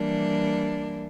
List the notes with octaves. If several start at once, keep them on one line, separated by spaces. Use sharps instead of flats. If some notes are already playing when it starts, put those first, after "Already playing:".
Already playing: E3 G3 A#3 D4